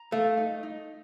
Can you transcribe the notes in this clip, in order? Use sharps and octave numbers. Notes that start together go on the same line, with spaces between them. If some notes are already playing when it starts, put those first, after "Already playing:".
Already playing: A#5
A3 F5
D#4
D#4